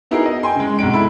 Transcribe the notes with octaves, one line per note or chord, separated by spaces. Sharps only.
B3 D#4 E4 F#4 G#4 A#4
D#5
G5 G#5 C6
C#3 G#3
B1 C3 G#3 D7
E4 A4 B5